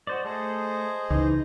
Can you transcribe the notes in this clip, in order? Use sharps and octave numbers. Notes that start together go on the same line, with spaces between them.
F#4 C5 D5 D#5
A3 G#4 A4 C5 D#5
C#2 E3 D#4